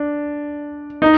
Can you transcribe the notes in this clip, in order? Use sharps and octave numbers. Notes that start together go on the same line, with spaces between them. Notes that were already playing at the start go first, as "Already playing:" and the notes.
Already playing: D4
D#4